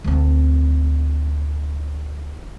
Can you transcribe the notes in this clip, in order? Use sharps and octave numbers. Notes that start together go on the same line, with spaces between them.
D2 C4